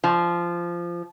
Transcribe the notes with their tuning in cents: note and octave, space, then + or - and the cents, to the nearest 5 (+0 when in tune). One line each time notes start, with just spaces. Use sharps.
F3 -15